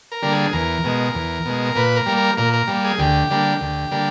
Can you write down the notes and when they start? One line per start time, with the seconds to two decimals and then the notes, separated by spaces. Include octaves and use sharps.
0.12 A#4
0.22 D3 G3 A#3
0.32 G#4
0.53 E2 A#4
0.84 B2 G#3
1.14 E2
1.45 B2 G#3
1.75 A#2 B4
1.96 A#4
2.06 G3 A#3
2.17 A#4
2.37 A#2 A#4
2.53 A#4
2.67 G3 A#3
2.84 G#4
2.98 D2 G4
3.30 D3 G3 A#3
3.60 D2
3.91 D3 G3 A#3